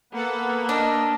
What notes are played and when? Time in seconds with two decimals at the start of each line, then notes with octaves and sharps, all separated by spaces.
0.13 A#3 B3 A4 B4 F#5
0.69 D4 A#4 D#5 E6